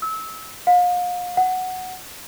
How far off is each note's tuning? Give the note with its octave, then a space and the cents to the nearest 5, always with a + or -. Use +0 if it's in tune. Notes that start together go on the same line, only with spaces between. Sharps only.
E6 -25
F5 +40
F#5 +0